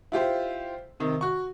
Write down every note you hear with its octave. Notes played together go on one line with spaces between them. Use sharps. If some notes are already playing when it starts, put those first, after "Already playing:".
E4 F4 G4 C5
C3 D#3
F#4 C#6